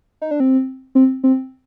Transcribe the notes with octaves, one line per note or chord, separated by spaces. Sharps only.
D#4
D4
C4
C4
C4